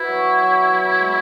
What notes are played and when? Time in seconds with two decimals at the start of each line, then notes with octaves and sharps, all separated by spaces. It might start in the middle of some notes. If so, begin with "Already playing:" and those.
Already playing: B2 B3 E4
0.09 F#3
0.38 F#3
0.69 F#3
1.00 G#3